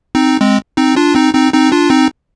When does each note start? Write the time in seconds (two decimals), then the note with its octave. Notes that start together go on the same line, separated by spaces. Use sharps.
0.15 C4 D#4
0.40 G#3 C4
0.77 C4 D#4
0.96 D4 F4
1.15 C4 D#4
1.34 C4 D#4
1.53 C4 D#4
1.72 D4 F4
1.90 C4 D#4